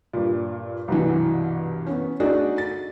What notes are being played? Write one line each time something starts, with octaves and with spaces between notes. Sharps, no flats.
G2 A#2
C2 G2 B2 E3
B3 C#4
A3 D4 D#4 F#4 G#4 A4
A6